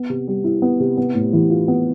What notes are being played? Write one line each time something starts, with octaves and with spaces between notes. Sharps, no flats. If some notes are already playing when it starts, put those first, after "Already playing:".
Already playing: B3
C3
G3
E4
B3
C3
B3
A2
E3
F4
B3